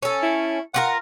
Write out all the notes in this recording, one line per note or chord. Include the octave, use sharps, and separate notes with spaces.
C#4 A4
E4
F4 F#4 A#4 F#5